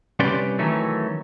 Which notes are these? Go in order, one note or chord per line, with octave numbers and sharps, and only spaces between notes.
C2 C#4 G4 B4 D5 C6
D#3 E3 F#3 A3 C#4